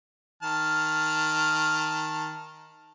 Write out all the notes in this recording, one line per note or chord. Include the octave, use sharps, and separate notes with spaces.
D#3 A5 F6